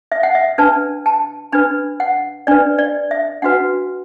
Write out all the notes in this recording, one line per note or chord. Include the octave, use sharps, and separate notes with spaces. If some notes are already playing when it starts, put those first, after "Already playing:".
E5
F#5
E5
D4 B4 A5
A5
D4 B4 B5
F#5
D4 B4 D5
D5
E5
D4 F#4 B4 F#5